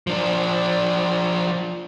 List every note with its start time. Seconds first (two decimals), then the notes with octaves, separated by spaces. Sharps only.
0.07 F3 D4